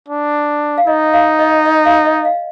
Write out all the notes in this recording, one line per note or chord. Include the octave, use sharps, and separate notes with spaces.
D4
F5
D#4 D#5
F5
D#5
D#5
F5
D#5
F5